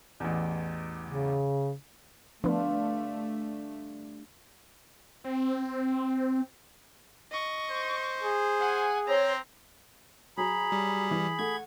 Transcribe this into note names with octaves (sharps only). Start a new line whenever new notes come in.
A1 E2
C#3
G2 F3 A3 B3 D4 F4
C4
D#5 C#6
C5
G#4
F#5 G#5
C4 C5 C#5 A#5 C6
F#3 G#4 A#5 B5
G3
E3
A3 F#5 G#6